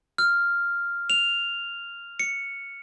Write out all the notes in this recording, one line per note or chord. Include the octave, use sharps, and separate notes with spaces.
F6
F7
C#7